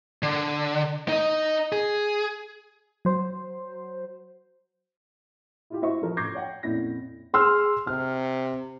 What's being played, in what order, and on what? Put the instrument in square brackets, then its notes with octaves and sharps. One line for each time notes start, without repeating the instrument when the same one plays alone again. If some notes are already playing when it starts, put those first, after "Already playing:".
[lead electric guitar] D3
D#4 D#5
G#4
[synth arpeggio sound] F#3 C5
[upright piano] E4 F4 G4
E4 F#4 C5 E5 C#6
F3 A#4
C#6 D6 G6 G#6 A#6 C7
C#5 F#5 G5
F2 A#2 C#4 E4 A#6
[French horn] G#4 [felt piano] C6 E6 F6
[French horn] C3 [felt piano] F6